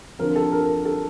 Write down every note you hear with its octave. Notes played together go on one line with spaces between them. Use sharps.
D3 F3 C4 A#4
A4
A#4
A4